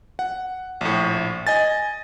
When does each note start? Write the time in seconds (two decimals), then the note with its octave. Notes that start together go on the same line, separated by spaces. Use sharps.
0.19 F#5
0.81 A#1 A2
1.47 D#5 G#5 A6